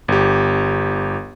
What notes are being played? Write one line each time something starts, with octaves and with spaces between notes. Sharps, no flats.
G1 G4